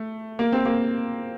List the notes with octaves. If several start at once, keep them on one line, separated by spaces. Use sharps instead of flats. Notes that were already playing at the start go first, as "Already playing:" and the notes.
Already playing: A3
A#3
C4
A#3